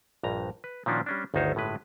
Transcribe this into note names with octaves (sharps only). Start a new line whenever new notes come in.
A#1 G2 A#5
B4
A#2 D#3 F3 C#4 D4 F#4
G3 C#4 D4
G1 D2 D#3 D#4 C5 C#5
G1 A2 G#3 B4